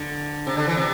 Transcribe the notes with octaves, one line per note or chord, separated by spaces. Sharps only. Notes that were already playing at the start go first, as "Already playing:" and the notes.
Already playing: D3
C3
D3
E3
C3